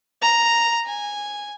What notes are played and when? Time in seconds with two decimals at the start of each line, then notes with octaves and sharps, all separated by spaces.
0.22 A#5
0.86 G#5